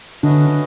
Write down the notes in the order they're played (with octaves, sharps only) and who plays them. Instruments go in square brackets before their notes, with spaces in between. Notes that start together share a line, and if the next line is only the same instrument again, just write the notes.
[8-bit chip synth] D3 D4 [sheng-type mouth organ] A3 C#4 F#4 B4 D#5